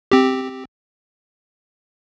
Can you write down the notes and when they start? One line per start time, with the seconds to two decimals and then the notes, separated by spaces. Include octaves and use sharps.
0.12 C4 G4